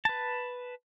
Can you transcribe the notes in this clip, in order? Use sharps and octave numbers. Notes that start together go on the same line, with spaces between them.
B4 A5